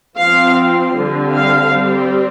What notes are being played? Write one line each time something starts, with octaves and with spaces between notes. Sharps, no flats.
F3 C4 F5
D3 G3 C4
F5
G3 C4